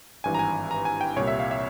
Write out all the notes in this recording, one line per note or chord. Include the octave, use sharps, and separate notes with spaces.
G#1 G2 E3 G#5
A#5
G#5
A#5
G#5
G5
C2 A#2 G3 C#5
E5
F5
E5